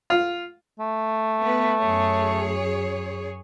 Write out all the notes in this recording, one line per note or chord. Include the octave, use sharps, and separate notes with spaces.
F4
A3
B3 B4
F#2 G#4 C#5